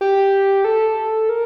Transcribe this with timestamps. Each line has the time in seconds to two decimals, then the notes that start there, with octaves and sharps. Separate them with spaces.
0.01 G4
0.65 A4
1.29 A#4